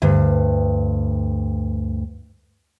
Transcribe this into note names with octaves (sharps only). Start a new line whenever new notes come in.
D2 G2